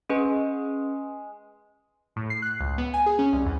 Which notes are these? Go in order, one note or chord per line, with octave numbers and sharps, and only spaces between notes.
G#3 C#4 G#4 B4
A2
C7
F#6
C#2
B3
G#5
G#4
C#4
C2
E2